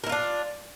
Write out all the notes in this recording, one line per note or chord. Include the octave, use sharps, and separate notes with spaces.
D4 E4 F4 A#4